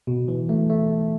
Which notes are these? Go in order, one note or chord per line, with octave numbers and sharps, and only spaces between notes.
B2
E3
A3
A3